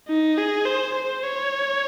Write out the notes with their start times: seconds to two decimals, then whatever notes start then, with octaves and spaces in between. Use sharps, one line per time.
0.08 D#4
0.38 G#4
0.66 C5
0.95 C5
1.23 C#5